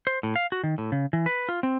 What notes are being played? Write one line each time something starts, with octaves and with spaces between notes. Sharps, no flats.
C5
A2
F5
F#4
D#3
A2
C#3
E3
B4
F4
C4